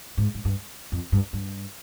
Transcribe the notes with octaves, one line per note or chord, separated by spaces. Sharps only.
G#2
G#2
G2
F2
G2
G2